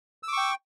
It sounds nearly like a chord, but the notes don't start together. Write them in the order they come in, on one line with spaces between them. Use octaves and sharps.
E6 D6 C#6 G5